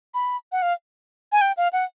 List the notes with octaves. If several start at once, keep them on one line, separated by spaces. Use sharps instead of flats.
B5
F#5
F5
G#5
G5
F5
F#5